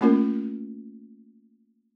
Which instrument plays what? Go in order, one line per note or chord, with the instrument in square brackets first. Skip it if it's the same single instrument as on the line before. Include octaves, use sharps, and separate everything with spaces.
[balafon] A3 A#3 C#4 F4 A#4